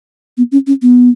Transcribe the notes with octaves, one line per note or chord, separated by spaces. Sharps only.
B3
C#4
C#4
B3